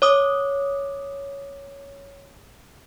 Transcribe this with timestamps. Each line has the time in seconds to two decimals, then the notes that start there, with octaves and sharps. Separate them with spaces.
0.02 C#5 D6 D#6